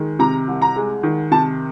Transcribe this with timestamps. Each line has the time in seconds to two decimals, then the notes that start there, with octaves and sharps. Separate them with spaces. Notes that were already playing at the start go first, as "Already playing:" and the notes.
Already playing: D#3 G#3
0.19 C3 A#5
0.48 C2
0.62 A#5
0.76 G#3
1.03 D#3
1.31 C3 A5